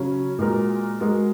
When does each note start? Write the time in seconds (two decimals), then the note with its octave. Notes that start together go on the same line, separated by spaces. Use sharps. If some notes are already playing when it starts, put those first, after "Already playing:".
Already playing: C#3 F#3 C#4
0.39 A#2 G#3 F#4 A#4
1.00 G#3 F#4 A#4